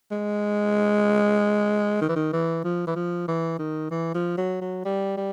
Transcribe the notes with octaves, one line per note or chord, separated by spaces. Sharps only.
G#3
D#3
E3
D#3
E3
F3
E3
F3
E3
D#3
E3
F3
F#3
F#3
G3
G3